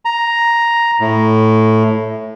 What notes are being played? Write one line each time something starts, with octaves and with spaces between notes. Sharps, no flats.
A#5
A2